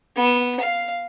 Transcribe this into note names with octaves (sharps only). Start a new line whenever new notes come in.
B3
F5